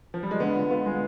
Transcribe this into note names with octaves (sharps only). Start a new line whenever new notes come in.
F3
G3
G#3
D3 B3
F4
B3 F4
G#3